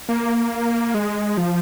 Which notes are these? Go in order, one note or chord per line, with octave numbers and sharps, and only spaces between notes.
A#3
G#3
F3